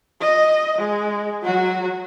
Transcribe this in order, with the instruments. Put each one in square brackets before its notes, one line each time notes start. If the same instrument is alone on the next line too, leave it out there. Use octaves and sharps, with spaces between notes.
[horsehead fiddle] D#5
G#3
F#3 F#4